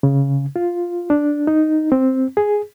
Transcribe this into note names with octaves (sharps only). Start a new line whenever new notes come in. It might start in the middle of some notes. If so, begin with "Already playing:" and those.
C#3
F4
D4
D#4
C4
G#4